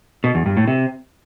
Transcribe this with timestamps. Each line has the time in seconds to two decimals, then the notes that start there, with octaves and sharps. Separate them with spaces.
0.24 B2
0.35 E2
0.46 G2
0.57 A2
0.68 C3